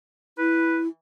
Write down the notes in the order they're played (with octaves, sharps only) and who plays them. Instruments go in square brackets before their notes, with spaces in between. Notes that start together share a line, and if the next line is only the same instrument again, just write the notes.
[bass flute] E4 [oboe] B4